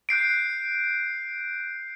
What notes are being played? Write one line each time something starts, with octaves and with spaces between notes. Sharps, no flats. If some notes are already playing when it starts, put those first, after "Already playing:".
F#6 G6 C7 D7